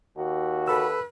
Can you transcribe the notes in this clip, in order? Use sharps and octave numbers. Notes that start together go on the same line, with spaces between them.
D#2 F#4
A4 B4 B5 E6